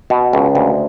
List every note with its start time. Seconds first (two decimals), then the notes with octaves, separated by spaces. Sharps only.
0.10 B2
0.33 C#2
0.55 D2